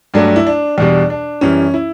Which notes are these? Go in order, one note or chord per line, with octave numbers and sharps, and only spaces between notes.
G2 F#3 A3 D4
D4
E4
D4
E2 B2 G3 D4
D4
F#2 E3 G3 C#4
E4